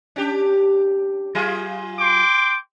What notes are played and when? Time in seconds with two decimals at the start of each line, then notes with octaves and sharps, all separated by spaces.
0.16 C#4 D4 G4
1.35 F#3 F4 G#4
1.99 G5 C6 D6